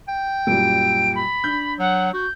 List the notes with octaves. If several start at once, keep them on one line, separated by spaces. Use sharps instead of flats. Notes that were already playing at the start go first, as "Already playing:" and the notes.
G5
F#2 A#2 G3 D7
B5
D4 G6
F#3 F#5
F#4 G6